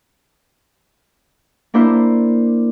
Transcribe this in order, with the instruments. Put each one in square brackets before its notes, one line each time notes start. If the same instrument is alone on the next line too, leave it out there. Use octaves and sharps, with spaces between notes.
[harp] A#3 D4 E4 C5